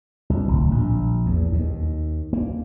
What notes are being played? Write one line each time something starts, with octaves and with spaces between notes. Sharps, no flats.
C2
D1
A#1
E2
D#2
A#3